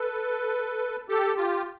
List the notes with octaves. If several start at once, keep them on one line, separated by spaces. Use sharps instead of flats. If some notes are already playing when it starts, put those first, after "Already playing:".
Already playing: A4 B4
G4 A4
F4 G4